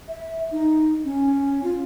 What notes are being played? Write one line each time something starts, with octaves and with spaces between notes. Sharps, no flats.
E5
D#4
C#4
F4